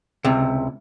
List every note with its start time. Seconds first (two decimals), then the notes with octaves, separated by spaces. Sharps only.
0.25 C#2 C3